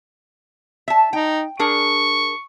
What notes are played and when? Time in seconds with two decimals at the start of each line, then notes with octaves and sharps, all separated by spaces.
0.88 E5 A5
1.13 D#4 G5
1.59 D4 G#4 A#4 C#6